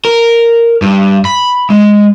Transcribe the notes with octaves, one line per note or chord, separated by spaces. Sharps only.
A#4
G2
B5
G#3